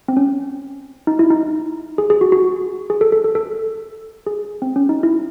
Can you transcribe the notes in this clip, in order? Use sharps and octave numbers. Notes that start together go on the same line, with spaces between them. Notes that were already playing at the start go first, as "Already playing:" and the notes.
C4
C#4
D#4
E4
D#4
G#4
G#4
F#4
F#4
G#4
A4
A4
A4
A4
G#4
C4
C#4
D#4
E4